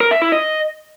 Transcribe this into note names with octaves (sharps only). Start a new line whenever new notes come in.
A#4
E5
E4
D#5